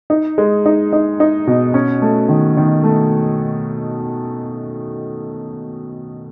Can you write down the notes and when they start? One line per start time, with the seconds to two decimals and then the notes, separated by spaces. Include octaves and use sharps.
0.10 D#4
0.38 G#3
0.66 D#4
0.93 D#4
1.20 D#4
1.47 B2
1.74 C#4
2.02 A3
2.29 D#3
2.57 D#3
2.83 A3